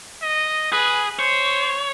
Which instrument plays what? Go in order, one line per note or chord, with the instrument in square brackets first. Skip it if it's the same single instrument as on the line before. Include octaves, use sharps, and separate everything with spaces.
[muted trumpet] D#5
[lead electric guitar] G#4 [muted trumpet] B4
[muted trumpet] C5 [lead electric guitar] C#5